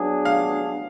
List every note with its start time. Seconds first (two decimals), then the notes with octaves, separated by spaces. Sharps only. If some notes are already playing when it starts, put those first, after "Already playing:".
Already playing: F#3 B3 D4 G#4
0.25 F5